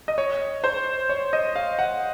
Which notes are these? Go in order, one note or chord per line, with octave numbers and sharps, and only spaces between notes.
D#5
C#5
C5
C#5
D#5
F5
F#5